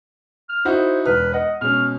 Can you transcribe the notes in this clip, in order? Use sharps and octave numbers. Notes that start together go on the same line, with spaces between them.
F6
D#4 E4 F#4 C5
E1 B4 F6
D#5 F#5
B2 G#3 C#4 F6